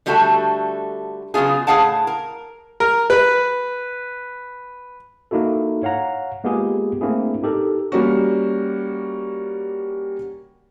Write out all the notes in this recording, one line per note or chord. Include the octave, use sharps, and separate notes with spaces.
D3 G3 A3 F#4 A4
C#3 F#3 B3 F4 G#4
A2 F4 G#4 F5 F#5 A5
A#4
A#4
B4
A#3 D#4 E4 F#4 A4
C#5 F5 F#5 A#5
G#3 A#3 B3 F4 G4 G#4
A3 A#3 C4 D4 E4 G#4
D#4 G4 A4 A#4
G3 A#3 C#4 F#4